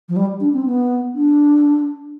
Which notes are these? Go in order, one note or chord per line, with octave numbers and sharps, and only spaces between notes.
F3
G3
D4
C4
B3
D4